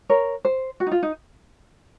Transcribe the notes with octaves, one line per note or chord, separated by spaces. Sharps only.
A#4 C#5
C5
F#4
D#4
F4
D#4